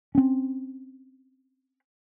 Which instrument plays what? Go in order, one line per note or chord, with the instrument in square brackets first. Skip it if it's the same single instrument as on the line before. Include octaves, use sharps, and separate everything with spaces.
[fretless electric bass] C4 C#4